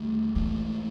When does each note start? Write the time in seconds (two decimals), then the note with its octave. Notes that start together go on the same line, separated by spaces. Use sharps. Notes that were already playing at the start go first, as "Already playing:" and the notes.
Already playing: D#2 D3 G3 A3
0.35 G#2 E3 A3 A#3